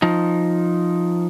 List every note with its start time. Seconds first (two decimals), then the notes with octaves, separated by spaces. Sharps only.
0.02 F3 D#4